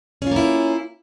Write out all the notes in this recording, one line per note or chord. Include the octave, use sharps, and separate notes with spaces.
A#3 C#4 E4 F4